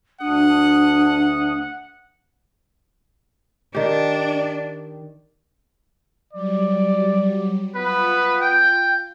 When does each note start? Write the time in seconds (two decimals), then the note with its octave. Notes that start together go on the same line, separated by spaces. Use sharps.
0.21 D2 D4 F#5 D#6
3.75 D#3 D4 G4
6.33 F#3 G3 D5
7.75 B3 F4 B4
8.41 G5